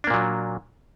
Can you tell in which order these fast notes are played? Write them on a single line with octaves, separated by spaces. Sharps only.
D4 A#3 A#2 F#3